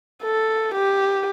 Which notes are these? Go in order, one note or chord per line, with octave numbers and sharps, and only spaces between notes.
A4
G4